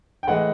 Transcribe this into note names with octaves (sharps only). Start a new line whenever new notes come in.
G5
A2 E3 G#3 F#5